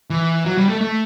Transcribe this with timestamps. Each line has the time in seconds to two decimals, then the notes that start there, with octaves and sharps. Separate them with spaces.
0.10 E3
0.45 F#3
0.58 G3
0.69 A3
0.81 A3